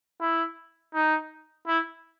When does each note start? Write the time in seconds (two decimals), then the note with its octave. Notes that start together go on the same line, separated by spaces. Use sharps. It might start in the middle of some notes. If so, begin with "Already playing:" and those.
0.21 E4
0.94 D#4
1.67 E4